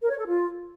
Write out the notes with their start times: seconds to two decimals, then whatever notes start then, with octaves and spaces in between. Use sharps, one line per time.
0.01 A#4
0.10 C#5
0.18 A4
0.26 F4